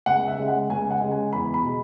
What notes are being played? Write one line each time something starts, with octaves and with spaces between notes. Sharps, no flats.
C#2 F#5
E5
C#3 G#3
F#5
C#2 G#5
F#5
C#3 G#3
G#5
E2 B5
B5
B2 G#3